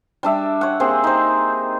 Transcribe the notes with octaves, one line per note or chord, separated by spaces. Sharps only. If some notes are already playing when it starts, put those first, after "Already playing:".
G3 D4 E5
C#5 F#5
A#3 C4 G4 G#4
D#4 C5